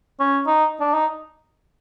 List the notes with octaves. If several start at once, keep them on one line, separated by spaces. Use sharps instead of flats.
C#4
D#4
D4
D#4